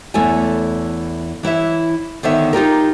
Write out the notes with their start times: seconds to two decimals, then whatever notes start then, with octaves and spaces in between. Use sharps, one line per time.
0.14 E2 A3 E4 A4 C#5 G#5
1.43 E3 E4 C#5 E5
2.23 D3 D#3 B3 C#5 E5
2.53 D#4 F4 G4 A#4